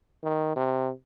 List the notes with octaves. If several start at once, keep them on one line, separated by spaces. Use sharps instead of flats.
D#3
C3